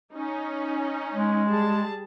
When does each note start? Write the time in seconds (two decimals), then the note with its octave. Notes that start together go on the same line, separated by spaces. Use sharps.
0.14 C#4 D#4
1.14 G#3
1.50 G3 G#4 A5